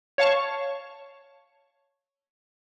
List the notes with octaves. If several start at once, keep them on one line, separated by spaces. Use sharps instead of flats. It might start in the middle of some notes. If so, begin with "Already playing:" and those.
C#5 F5 A5 C#6